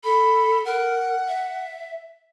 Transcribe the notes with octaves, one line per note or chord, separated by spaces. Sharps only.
A4 B5
A#4 F#5
E5